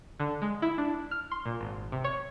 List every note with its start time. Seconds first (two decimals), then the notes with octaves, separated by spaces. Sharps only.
0.20 D3
0.42 G#3
0.62 E4
0.78 D4
1.11 F6
1.31 C6
1.45 A#2
1.61 G#1
1.92 C3
2.04 C#5